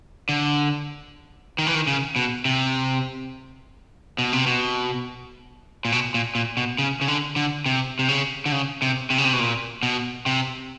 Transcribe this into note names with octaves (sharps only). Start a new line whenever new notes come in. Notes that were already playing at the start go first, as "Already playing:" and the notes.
D3
D#3
E3
D#3
C#3
B2
C3
B2
C3
B2
A#2
B2
A#2
A#2
B2
C#3
C#3
D3
D3
C3
C3
C#3
D3
C#3
C3
C3
C#3
C3
B2
A#2
B2
C3